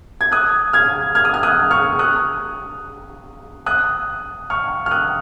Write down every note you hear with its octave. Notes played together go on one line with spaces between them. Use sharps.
G#6
D#6 F#6
F6 G#6
F6 G#6
D#6
F6
D#6 F#6
C#6 F6
D#6 F#6
D#6 F#6
C#6 F6
F6
D#6 F#6